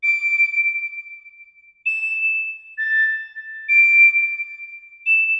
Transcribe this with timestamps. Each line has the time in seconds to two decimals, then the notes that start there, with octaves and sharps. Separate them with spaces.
0.03 D7
1.86 E7
2.78 A6
3.69 D7
5.06 E7